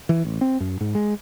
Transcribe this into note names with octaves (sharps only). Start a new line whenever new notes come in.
E3
A1
C4
F#2
G#2
G#3